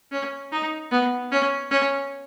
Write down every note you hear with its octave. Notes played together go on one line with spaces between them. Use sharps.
C#4
D#4
B3
C#4
C#4